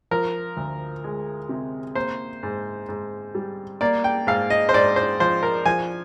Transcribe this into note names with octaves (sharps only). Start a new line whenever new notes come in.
F3 A#4
D2
G#3
C3
A#3 C5
G#2
G#2
G3
A#3 D5
G5
G#2 F5
D#5
C5
G#2 D5
C5
F3 C5
A#4
F3 G#5